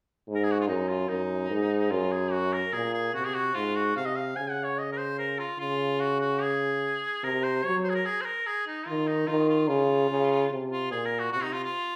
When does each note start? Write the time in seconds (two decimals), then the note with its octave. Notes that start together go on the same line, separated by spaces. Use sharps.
0.28 G#2
0.35 A#4
0.44 G#4
0.52 F#4
0.61 F4
0.68 F#2 D#4
0.89 F4
1.09 F#2 D#4
1.50 G#2
1.91 F#2 F4
2.12 G#4
2.32 F#4
2.53 A#4
2.73 A#2 G#4
2.94 G#4
3.14 C3 F#4
3.25 G#4
3.35 F#4
3.55 G#2 F4
3.76 F#4
3.96 C3 F5
4.06 D#5
4.16 F5
4.37 C#3 G#5
4.50 F#5
4.64 C#5
4.79 D#5
4.92 A#4
4.98 C5
5.19 A#4
5.39 F4
5.59 C#3 F4
6.00 F#4
6.21 F#4
6.42 G#4
7.23 C3 A#4
7.44 C5
7.65 F#3 C#5
7.84 C5
7.90 G#4
7.95 A#4
8.06 G#4
8.21 C5
8.25 A#4
8.46 G#4
8.67 D#4
8.87 D#3 F4
9.08 D#4
9.28 D#3 F4
9.49 F4
9.69 C#3 F4
10.10 C#3
10.52 C3
10.72 F4
10.91 A#2 G#4
11.05 A#4
11.19 F#4
11.32 C3 F#4
11.44 D#4
11.53 F4
11.63 F4